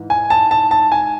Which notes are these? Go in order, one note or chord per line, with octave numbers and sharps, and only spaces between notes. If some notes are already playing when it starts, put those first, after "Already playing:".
Already playing: G#2 E3
G#5
A5
A5
A5
G#5